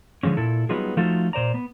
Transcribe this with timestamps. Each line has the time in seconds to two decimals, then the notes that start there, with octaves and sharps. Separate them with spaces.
0.23 D3 F3 G#3 C#4
0.37 A#2 E4 A4
0.69 F#3 G3 B3 D#4 F4 G#4
0.97 F3 A3 D#4 F4 F#4 A4
1.33 A#2 C5 D5 A#5
1.54 B3